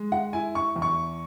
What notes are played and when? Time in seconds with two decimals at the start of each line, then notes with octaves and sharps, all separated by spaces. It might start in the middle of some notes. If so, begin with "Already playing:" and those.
Already playing: G#3
0.12 F#5
0.33 E4 G#5
0.55 C#6
0.76 E2
0.82 C#6